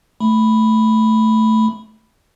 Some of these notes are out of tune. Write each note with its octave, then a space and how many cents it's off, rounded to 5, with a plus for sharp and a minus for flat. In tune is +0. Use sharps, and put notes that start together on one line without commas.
A3 +0 B5 +0